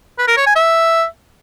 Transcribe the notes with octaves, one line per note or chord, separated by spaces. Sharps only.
B4
A#4
C#5
G#5
E5